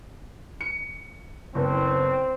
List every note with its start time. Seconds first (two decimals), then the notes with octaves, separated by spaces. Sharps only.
0.61 C#7
1.55 F#1 B3 C4